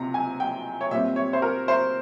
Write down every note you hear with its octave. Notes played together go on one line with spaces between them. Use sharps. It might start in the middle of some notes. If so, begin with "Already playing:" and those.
Already playing: C#2 C3 C4 A#5
G#5
G5
C#5
A#2 G3 C4 E5
C#5
C5
A#4
C5